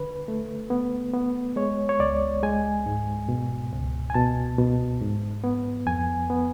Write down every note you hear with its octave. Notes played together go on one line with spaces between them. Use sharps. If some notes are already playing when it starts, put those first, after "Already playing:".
Already playing: D3 B4
A3
B3
B3
G#3 C#5
C#5
C#2 D5
G#3 G#5
G#2
B2
C#2
G#5
B2 A5
B2
G#2
B3
F2 G#5
B3